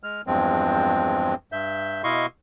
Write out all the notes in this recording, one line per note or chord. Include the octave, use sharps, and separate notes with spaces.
G#3 F6
E2 G2 F3 G#3 C4
G2 E5 G6
B2 E4 D#5 F5 C6 C#6